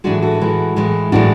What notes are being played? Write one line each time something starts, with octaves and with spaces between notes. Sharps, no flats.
A2 E3 G#3 D4 F#4
F#4 A4
A2 E3 G#3
A2 E3 G#3
A2 E3 G#3 D4 F#4